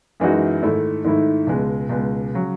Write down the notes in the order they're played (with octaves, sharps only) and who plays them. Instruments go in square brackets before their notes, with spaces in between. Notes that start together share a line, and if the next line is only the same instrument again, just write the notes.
[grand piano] F#2 E3 G#3 D#4 F#4
G#2 D#3 A3 E4
G#2 D#3 A3 E4
C#2 B2 G#3
C#2 B2 G#3
C#3 F#3